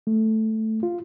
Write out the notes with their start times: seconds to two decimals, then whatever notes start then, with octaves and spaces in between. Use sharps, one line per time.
0.07 A3
0.83 F4